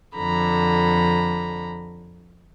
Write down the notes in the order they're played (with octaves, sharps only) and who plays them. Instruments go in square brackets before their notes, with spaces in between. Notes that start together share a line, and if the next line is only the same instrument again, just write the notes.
[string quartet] F2 D3 A#5 B5